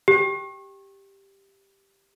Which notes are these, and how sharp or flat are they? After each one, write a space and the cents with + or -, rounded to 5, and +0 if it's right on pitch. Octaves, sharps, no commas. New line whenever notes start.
G4 +0